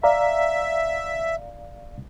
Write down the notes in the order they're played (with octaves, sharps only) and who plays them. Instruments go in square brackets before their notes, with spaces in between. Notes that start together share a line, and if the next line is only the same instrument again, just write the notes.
[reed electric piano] D5 F5 A#5 [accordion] E5